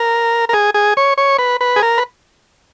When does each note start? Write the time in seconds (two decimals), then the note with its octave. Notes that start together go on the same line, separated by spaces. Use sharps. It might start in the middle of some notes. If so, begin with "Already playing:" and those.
Already playing: A#4
0.49 A#4
0.53 G#4
0.74 G#4
0.97 C#5
1.18 C#5
1.39 B4
1.61 B4
1.76 G#4
1.82 A#4
1.98 B4